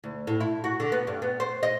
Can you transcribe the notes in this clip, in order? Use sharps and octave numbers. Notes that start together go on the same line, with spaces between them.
D2
A2
E4
F#4
D3
B3
G2
B3
C5
D#5